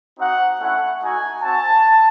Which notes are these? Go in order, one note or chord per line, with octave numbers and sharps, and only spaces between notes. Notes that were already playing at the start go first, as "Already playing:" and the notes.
C4 D#4 F#4 F#5
A3 C#4 E4 F#5
A3 D#4 F#4 G#5
C4 F#4 A5